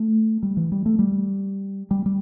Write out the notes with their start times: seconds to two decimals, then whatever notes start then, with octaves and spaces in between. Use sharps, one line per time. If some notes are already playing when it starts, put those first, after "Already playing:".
Already playing: A3
0.43 G3
0.57 E3
0.72 G3
0.86 A3
0.99 G3
1.91 G3
2.06 G3